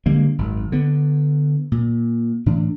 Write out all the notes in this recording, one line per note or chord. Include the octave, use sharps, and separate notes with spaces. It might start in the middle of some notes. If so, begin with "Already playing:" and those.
D3 G3 G#3 A#3
G#1 F#2
D3 B3
A#2
A2 E3 D4